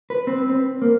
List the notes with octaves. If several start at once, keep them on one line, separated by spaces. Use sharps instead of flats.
B4
C4
C4
A#3